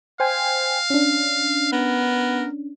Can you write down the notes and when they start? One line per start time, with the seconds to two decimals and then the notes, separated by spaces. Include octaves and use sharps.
0.20 C5 F5 G5 G#5
0.90 C#4 D4
1.73 B3 A#4